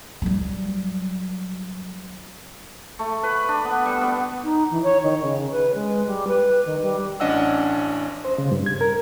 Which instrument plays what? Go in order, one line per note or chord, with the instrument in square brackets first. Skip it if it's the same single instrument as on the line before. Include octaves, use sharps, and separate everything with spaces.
[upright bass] F#3 G3
[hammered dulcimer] A3
B4
B5
D4
B3
G3
B3
[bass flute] D#4
E3
C#5
D#3
C#3
B4
G#3
G3
B4
D#3
G3
[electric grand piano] A1 C#4 D4 D#5 F#5 E6
[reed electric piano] C5
C#3
G2
G#6
A#4